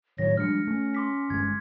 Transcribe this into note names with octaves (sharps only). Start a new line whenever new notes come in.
A2 D#3 F#3 C#5 A#6
F3 G3 G#3 D4 F6 C#7
A3 C#4
C6 D6 B6
G1 G#3 G#6